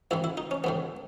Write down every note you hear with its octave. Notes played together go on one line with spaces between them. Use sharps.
A1 G#2 D#3 E4
E4
D#4
C#4
A1 G#2 D#3 B3